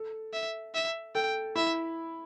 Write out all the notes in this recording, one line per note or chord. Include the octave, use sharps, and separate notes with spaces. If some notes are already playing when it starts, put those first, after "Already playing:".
Already playing: A4
E5
E5
A4 G5
E4 E5